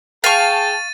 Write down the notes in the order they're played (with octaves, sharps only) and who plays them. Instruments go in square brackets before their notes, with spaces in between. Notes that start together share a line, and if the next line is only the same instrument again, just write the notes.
[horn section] G#4 G5 A5 [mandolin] F5 C#6 [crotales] A6 D#7